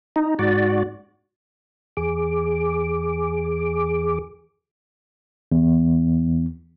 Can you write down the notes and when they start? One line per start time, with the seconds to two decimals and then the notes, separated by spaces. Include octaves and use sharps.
0.16 D#4
0.39 G#2 F#4 D5
1.97 E2 G#4 D6
5.52 E2